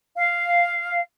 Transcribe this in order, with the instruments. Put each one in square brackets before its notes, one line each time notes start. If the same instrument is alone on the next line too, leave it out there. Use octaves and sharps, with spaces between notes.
[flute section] F5